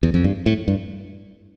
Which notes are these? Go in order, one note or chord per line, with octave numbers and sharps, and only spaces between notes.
E2
F2
G2
A2
G2